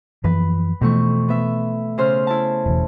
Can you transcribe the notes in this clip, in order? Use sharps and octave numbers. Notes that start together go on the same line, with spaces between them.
F#2 E3 F3 B4
F2 B2 E3 A3 C#6
B3 E5
C#3 C5 F6
E4 A5
E1 E2